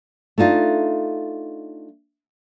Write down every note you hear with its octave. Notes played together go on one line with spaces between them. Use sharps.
A3 D4 D#4 F4